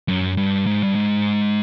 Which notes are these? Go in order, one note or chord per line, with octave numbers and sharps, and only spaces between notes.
F#2
G2
G#2
G2
G#2